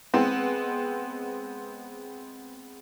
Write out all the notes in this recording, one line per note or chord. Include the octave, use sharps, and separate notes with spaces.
G#3 B3 C4